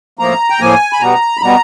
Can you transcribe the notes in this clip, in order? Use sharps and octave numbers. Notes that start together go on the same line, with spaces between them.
A2 F3 A#3 A#5
G5
A2 F3 A#3 G#5
B5
B2 G3 B3 A#5
B5
B2 G3 B3 A#5